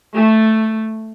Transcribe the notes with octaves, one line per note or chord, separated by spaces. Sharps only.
A3